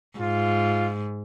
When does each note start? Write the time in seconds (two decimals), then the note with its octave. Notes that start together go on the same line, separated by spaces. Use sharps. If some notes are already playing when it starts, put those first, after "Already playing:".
0.19 G#2 F4